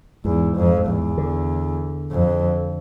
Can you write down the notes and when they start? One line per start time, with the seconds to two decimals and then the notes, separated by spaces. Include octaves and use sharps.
0.25 E2 G#2
0.56 F2
0.87 E2
1.18 D3
2.11 F2